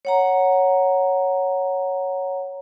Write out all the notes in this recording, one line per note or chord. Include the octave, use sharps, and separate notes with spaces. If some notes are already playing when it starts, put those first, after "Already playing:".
C#5 F#5 A#5